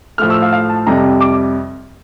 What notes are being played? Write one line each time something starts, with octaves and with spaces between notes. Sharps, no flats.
A2 F3 A3 F6
E6
F5
F5
A5
F2 C3 G3 A#5
D6